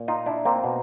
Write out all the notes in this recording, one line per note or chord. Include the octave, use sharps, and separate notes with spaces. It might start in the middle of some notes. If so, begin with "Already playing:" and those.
Already playing: A#2
D#4 F4
D4 E4
A#3 C4
B2